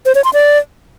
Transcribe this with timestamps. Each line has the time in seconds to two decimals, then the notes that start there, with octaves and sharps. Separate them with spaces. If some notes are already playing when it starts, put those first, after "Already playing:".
0.06 C5
0.15 C#5
0.24 C6
0.33 D5